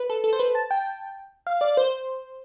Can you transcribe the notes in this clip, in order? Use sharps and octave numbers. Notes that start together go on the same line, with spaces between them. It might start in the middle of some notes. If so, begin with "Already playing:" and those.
Already playing: B4
A4
A4
C5
B4
A5
G5
F5
D5
C5